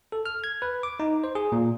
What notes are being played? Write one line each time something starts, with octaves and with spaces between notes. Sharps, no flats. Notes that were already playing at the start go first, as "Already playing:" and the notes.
A4
F6
G#6
B4
D6
D#4
C5
G#4
A#2